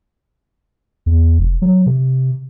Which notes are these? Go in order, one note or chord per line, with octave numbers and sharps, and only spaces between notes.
E2
F1
F#3
C3